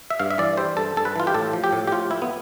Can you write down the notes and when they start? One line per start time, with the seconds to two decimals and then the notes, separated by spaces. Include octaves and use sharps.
0.10 E5
0.20 G2 F5
0.30 E5
0.38 E3 D5
0.57 G3 C5
0.77 G2 A4
0.96 G2 A4
1.05 B4
1.16 E3 F4
1.27 G4
1.34 A2 A4
1.53 F3
1.64 G4
1.72 A2
1.88 G4
1.92 F3 F4
2.11 A2 E4
2.22 B3